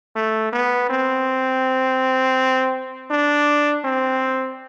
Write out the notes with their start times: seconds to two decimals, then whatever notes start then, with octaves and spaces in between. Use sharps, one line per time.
0.16 A3
0.53 B3
0.90 C4
3.11 D4
3.85 C4